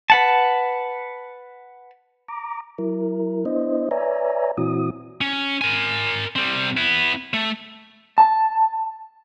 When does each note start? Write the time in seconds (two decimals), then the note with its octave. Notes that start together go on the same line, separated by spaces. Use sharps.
0.10 B4 F#5 A5
2.28 A#5 D6
2.78 F#3 E4 A#4
3.45 B3 D4 E4 C5 D#5
3.91 B4 C#5 D5 E5 G#5 A#5
4.57 A#2 E3 C4 E4 F#4 D#6
5.21 C#4
5.61 A#4 G#5
6.36 G3 C4
6.77 B3 E4
7.34 A3
8.18 A5